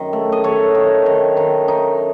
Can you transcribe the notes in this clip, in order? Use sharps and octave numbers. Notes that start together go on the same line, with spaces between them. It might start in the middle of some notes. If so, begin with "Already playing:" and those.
Already playing: F#2 D#3
A3
D#5
D#3 A4 C#5
D#3
D#3
D#3
D#4